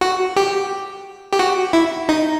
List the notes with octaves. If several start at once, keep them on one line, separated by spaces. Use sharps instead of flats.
F#4
G4
G4
F#4
E4
D#4